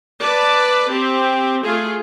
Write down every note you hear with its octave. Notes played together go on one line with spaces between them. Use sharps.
B4 D5 A5
C4 G4
A3 F4 G#4